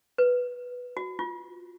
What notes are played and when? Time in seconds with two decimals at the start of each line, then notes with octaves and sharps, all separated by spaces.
0.18 B4
0.97 F#4
1.19 F4